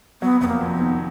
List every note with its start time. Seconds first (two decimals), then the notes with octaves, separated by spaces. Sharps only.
0.22 F#3 B3
0.41 F1 B3
0.48 A#3
0.61 F2
0.74 B3
0.80 D#3